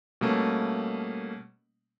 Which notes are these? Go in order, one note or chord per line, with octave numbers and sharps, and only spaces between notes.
B2 G3 A3 A#3 C#4